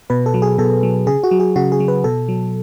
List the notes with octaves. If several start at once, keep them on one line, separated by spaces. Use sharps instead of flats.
B2 B4
A4
F#3
G#4
B2 A4
F#3
C#3 G#4
F#4
F#3
G#4
C#3 F#4
G#4
F#3
B4
B2 A4
F#3